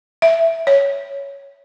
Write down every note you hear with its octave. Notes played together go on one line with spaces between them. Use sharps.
E5
C#5